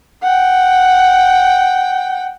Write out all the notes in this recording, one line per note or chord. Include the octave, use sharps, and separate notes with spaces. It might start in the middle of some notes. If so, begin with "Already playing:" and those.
F#5 G5